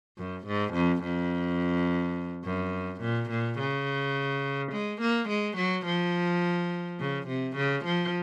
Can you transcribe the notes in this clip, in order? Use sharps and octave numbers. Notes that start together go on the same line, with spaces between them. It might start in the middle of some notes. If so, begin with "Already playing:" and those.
F#2
G#2
F2
F2
F#2
A#2
A#2
C#3
G#3
A#3
G#3
F#3
F3
C#3
C3
C#3
F3